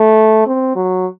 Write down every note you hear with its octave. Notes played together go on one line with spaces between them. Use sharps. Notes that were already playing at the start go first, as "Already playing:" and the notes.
Already playing: A3
C4
F#3